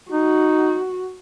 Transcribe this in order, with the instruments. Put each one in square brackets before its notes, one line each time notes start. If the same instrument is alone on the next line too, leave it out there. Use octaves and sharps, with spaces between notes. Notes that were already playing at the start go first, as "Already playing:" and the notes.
[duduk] D#4 [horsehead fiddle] F#4